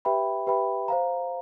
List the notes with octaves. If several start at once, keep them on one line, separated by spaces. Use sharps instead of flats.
G4 B4 E5 G5 B5
G4 B4 E5 G5 B5
C5 F5 A#5